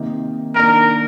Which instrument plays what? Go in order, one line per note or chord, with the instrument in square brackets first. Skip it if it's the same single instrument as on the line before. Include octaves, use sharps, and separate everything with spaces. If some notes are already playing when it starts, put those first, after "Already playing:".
Already playing: [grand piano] C3 D#3 A#3 D#4
[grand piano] D#3 A#3 D4 [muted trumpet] A#4